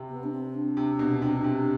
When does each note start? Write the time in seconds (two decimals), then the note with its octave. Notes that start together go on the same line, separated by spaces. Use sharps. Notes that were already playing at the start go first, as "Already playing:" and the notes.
Already playing: C3
0.10 B3
0.23 D4
0.32 C4
0.54 D4
0.77 C3
0.99 B2
1.22 C3
1.44 C3